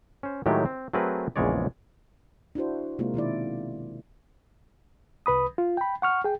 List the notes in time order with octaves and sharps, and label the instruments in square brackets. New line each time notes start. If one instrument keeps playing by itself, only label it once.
[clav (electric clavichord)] C#4 C5
A2 D#3 F#3 G#3 A3 G4
C4
F#3 A3 C4 G#4 A#4 B4
A#1 E2 C#3 G#3 C#5 D5
[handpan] D4 E4 F#4 C5
C3 G#3 A#3 C4 F4
B2 D#3 E4 D5
[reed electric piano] C2 B4 B5 D#6
F4
G5 B5
F#5 C#6 F6
G#4 G5